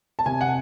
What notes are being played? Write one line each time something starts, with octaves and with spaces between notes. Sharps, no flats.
A5
C3 G#5
F#5